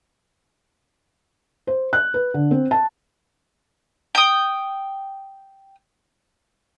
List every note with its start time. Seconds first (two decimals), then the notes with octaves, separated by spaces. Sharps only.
1.67 C5
1.93 F#6
2.14 B4
2.34 D3
2.51 C4
2.71 A5
4.15 G5 D#6